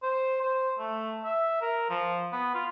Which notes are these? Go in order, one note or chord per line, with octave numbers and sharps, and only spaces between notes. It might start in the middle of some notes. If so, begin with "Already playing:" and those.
C5
C5
A3
E5
A#4
F3
B3
F4